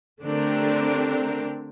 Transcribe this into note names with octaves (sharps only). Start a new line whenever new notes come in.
D3 A3 C4 D4 G4 A#4